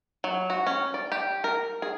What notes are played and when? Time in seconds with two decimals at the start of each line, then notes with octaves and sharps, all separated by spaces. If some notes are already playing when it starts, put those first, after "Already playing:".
0.24 F#3
0.50 F#4
0.67 C#4
0.94 D5
1.12 G4
1.44 A#4
1.82 G#4